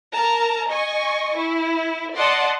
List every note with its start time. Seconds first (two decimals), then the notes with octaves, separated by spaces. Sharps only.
0.13 A#4 A5 A#5
0.69 D#5 G#5 C#6
1.37 E4
2.17 D5 D#5 F#5 A5 C6